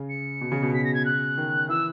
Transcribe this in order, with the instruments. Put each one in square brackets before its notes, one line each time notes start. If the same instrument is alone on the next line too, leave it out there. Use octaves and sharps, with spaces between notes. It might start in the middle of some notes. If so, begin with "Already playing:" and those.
Already playing: [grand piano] C#3
[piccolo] C#7
[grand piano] B2
C#3
B2
[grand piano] C#3 [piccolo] B6
[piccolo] A#6
G#6
F#6
[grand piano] D#3
[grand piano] E3 [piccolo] E6